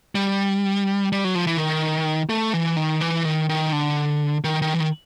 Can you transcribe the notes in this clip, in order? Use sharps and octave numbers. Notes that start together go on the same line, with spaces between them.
G3
G3
F#3
F3
E3
D#3
A3
E3
D#3
E3
D#3
D#3
D3
D#3
D#3
E3
D#3